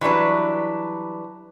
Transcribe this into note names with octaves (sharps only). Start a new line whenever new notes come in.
E3 F#3 G3 D4 B4